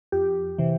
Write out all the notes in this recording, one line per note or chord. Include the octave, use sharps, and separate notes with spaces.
F2 G4
C3 E3